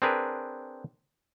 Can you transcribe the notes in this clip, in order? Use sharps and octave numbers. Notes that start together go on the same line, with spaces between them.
C4 D4 G#4 A#4 B4